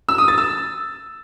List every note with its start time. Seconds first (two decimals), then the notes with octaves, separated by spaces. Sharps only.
0.09 E6
0.18 D#6
0.28 A6
0.38 E6